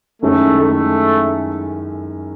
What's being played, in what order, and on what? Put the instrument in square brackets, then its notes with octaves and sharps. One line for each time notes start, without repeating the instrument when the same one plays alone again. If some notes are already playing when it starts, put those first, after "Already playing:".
[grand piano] F#2 D#3 G#3 C#4 E4 [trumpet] A3
[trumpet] A3